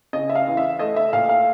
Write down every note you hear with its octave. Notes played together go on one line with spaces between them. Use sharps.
C#3 D#5
E5
F5
E2
E5
A3 D#5
E5
A#2 F5
F5